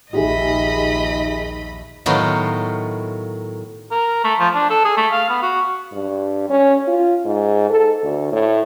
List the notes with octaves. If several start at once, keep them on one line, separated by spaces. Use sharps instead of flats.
A#1 D#2 D#4 G4 G#4 D#5 E5 B5
A2 D#3 F#3 B3 F4
A#4
A3
F3
D4
A4
G#4
A3
F5
B3
F#4
G2
C#4
F4
G#2
A4
D2
A2